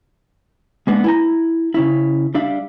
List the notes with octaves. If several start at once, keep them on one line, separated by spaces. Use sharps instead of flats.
G#3 A#3 B3 D4
E4 G#5 A#5
C#3 C#4 E4
G3 D4 E5 F5